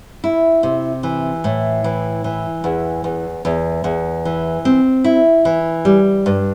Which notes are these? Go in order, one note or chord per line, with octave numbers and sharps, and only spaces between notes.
E4
C3
E3
A2
E3
E3
E2
E2
E2
E2
E3
C4
E4
E3
G3
G2